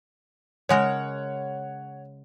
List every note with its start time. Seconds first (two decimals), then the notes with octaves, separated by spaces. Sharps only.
0.69 C#3 G#3 A#4 C#5 F#5